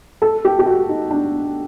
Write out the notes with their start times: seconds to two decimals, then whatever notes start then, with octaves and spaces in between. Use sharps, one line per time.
0.22 A4
0.45 G4
0.59 G4
0.66 F#4
0.89 D#4
1.11 D4